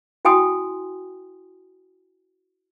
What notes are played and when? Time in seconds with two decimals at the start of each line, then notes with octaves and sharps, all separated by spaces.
0.25 E4 F#4 G5 G#5 C6 D#6